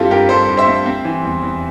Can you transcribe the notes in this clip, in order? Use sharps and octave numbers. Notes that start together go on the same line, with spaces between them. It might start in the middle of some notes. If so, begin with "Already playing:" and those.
Already playing: G2 C4 E4 F4 G4 A4
G2 G4 A#4
G2 A4 C5
G2
C5 E5
C4
C4
E3
E2
E2